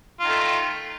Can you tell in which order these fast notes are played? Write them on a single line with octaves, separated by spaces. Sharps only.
F4 D#3 A3